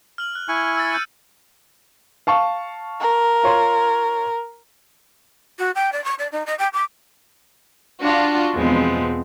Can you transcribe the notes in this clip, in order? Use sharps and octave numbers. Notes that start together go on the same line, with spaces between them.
F6 F#7
F#6
E4 G#5 C#6
E6 A6 C#7
G6 D#7
F5 A5 C#6
A#4
F4 C#5 C6
F#4
G5
D5
C#6
D5
D#4
D#5
G5
D6
D4 F4 F#4
E2 B2 F3 G#3 B3 C4